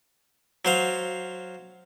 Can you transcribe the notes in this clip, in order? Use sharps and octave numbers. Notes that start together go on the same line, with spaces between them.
F#3 C5 F5